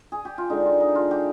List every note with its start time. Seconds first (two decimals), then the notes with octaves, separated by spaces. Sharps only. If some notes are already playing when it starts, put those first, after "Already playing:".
Already playing: A#4
0.12 G#4
0.25 G4
0.38 F4
0.50 D3 G#3 D4 D#4
0.65 F4
0.80 D#4
0.95 F4
1.11 G4